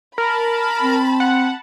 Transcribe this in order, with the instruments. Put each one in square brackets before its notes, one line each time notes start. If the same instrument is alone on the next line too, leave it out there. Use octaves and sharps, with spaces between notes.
[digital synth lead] A#4 [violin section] A5 B5
[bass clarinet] C4
[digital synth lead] F#5